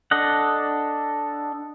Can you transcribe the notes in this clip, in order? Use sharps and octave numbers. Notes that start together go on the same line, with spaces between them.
D4 A4 D#5 F#5